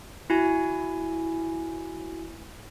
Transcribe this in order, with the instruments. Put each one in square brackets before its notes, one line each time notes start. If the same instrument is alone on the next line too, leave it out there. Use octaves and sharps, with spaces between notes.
[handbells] E4 F#4 G#5